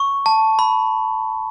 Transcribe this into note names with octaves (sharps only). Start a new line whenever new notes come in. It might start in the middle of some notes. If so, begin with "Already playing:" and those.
Already playing: C#6
A5
B5